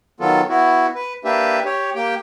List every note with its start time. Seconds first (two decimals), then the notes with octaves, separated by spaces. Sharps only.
0.20 D#3 F#3 B3 F4 A4
0.49 B3 E4 F#4
0.95 B4
1.25 A#3 D4 G4 B4 E5
1.65 G4 C#5
1.96 A#3 G4 G5